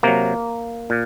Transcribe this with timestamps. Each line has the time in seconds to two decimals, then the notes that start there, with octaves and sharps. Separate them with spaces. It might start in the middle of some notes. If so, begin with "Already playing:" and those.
0.03 C3 F#3 A#3
0.90 A#2